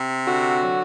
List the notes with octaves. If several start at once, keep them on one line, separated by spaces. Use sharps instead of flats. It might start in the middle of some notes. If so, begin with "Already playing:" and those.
Already playing: C3
D3 F#4
F#3